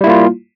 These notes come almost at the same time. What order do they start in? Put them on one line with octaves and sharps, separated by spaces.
G3 E4 A#3 F4